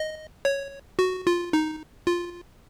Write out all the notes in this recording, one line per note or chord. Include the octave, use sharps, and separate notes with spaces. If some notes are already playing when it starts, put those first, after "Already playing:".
Already playing: D#5
C#5
F#4
F4
D#4
F4